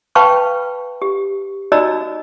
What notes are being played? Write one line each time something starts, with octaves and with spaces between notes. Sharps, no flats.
B4 F5 G5 A5 B5 C#6
G4
D#4 F#4 D5 D#5 A#5 E6